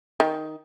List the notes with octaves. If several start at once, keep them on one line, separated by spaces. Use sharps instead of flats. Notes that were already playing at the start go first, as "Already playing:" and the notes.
D#3